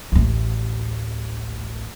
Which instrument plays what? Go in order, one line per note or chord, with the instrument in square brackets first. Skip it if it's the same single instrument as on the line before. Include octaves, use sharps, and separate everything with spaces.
[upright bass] A1 D2